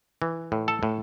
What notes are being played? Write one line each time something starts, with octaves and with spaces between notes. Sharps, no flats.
E3
A2
A4 A5
A2